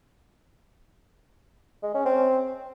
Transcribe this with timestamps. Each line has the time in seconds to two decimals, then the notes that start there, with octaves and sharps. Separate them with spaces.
1.82 G#3
1.94 C#4
2.05 C4